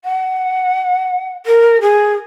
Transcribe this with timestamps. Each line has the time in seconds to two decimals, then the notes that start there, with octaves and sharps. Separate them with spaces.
0.04 F#5
1.46 A#4
1.81 G#4